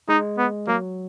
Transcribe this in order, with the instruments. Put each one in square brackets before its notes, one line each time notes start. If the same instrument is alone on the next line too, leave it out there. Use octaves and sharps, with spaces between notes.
[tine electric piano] G#3 [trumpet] D#4
[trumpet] B3
[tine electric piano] F#3 [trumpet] A#3